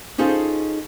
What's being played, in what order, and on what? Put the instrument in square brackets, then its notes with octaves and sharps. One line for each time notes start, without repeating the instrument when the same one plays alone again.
[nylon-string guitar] C#4 D#4 F4 G#4 A4 C5